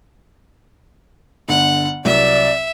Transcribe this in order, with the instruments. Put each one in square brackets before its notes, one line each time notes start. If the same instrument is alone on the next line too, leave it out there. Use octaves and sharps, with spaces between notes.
[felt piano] G1 D3 [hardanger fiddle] F#5
[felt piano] C2 F#3 [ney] D5 [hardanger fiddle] E5